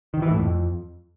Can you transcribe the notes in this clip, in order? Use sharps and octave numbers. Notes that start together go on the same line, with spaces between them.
D#3
E3
A2
F2